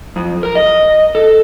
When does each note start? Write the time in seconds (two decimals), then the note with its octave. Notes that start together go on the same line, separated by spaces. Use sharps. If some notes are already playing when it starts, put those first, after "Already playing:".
0.16 F2
0.43 A#4
0.55 D#5
1.15 A4